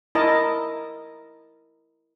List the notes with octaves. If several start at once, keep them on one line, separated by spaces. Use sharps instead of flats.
E4 A#4 D#5 A5